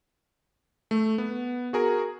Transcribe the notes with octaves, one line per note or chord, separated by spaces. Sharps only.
A3
B3
F#4 G#4 A#4